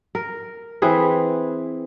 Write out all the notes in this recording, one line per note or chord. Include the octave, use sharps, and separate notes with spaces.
A#4
E3 C4 G#4 B4